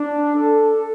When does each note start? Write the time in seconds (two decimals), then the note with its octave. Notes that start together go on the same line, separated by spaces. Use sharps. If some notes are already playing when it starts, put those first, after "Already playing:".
Already playing: D4
0.35 A4